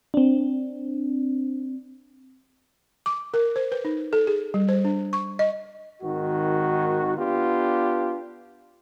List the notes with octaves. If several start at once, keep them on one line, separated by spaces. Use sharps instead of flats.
C4 D4
D6
A#4
C5
B4
D#4
A4
G#4
G3
C5
D4
C#6
D#5
G#1 D#3 F#4
B3 D4 F4 G4